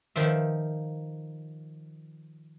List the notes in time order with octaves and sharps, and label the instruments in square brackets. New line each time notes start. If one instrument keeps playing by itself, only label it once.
[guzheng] D#3 F3 E5